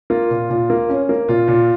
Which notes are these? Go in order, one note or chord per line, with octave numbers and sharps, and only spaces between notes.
A#3 F4
A#2
A#2
A#3
C#4
A#3
A#2 F4
A#2